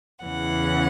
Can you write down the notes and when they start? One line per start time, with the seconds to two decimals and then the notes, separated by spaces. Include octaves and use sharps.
0.24 E2 C#3 E3 F#5